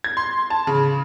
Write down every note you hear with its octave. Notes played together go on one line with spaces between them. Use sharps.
G#6
C6
A5
C#3